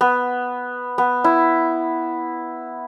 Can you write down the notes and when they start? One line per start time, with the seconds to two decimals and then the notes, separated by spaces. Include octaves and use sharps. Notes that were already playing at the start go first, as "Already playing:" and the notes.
0.01 B3
0.98 B3
1.24 E4